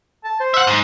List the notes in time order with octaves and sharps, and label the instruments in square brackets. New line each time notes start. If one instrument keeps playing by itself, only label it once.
[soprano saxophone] A5
C5
[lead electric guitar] E5 F#5
G#2